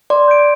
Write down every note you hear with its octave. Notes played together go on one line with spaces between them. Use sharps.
D5 C6
G6 D7